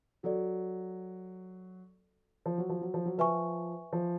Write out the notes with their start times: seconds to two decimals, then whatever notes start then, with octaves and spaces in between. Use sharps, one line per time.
0.23 F#3 F#4 A4 D5
2.46 F3
2.58 F#3
2.69 F3
2.81 F#3
2.94 F3
3.06 F#3
3.18 F3 B4 E5 G#5 C#6
3.93 F3